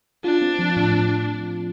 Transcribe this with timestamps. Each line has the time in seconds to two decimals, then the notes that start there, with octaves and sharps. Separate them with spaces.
0.24 D4 F4
0.42 C4
0.59 F3
0.76 A2